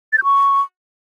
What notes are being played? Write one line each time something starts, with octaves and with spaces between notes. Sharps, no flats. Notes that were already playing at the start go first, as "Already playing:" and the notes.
A6
G6
C#6